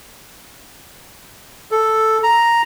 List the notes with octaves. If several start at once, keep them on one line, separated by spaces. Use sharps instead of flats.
A4
A#5